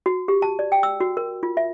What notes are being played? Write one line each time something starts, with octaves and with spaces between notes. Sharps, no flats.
F#4
G4
A5
D5
G5
E6
F#4
A#4
F4
E5